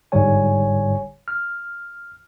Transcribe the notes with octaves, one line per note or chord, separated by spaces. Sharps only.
G1 G#2 D3 G3 C#5 G#5
F6